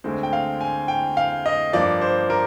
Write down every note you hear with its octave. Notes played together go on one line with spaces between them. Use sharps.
D2 D3 G#3 C4
G5
F5
G#5
G5
F5
D#5
G2 F3 A#3 D5
C5
A#4